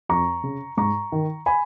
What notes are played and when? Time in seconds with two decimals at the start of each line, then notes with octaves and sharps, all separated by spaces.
0.09 F2 A#5 C#6
0.44 C#3
0.77 G#2 A#5 C#6
1.12 D#3
1.46 G#5 B5